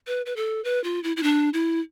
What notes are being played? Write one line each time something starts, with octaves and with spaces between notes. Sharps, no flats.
B4
B4
A4
B4
F4
E4
E4
D4
E4